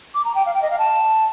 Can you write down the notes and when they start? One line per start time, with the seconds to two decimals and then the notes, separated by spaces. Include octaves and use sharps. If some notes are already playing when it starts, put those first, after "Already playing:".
0.14 D6
0.25 A#5
0.35 G5
0.46 F5
0.54 G5
0.62 D#5
0.70 F5
0.79 A5